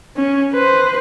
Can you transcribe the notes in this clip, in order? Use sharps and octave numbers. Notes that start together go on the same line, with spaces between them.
C#4
B4 C5